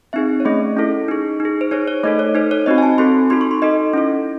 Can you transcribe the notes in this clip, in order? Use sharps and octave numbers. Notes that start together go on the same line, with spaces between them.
C4 D#4 G#4 E5
C#5
A3 C#4 G#4 D#5
C#4 E4 A4
D#4 G#4
D#4
G#4
C5
D#4 G#4 C#5
C#5
A3 D#4 A4 D#5
C#5
D#4 A4 C5
C#5
C4 D#4 F#4 D#5
G#5
A5
C4 F#4 A4 C6
D#4 F#4 A4 C6
C#6
C6
D#4 A4 D#5
C#4 E4 A4